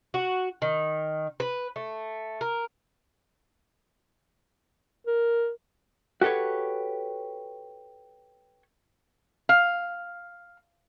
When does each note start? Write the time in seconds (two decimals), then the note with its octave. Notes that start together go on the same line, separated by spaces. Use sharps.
0.14 F#4
0.62 D#3
1.40 B4
1.76 A3
2.41 A#4
5.07 A#4
6.21 F#4 G4 A4 B4 C#5
9.49 F5